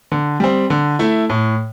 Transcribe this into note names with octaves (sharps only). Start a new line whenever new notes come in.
D3
G3 C4
D3
A3 E4
A2